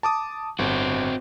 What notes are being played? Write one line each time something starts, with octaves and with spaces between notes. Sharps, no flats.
A5 D6 D#6
G1 C4 F#4